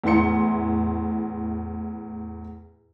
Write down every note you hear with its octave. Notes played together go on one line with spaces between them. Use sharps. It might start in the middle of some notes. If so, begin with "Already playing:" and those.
E2 A2 E4 C6 C#7